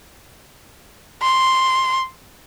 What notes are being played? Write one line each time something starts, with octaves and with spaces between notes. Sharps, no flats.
C6